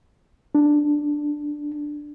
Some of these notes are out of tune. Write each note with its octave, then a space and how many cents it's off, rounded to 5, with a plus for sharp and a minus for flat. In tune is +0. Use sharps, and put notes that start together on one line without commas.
D4 +5